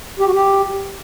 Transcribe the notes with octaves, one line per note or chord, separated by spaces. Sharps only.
G4
F#4
G4